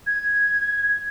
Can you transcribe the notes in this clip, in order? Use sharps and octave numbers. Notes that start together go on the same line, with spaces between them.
G#6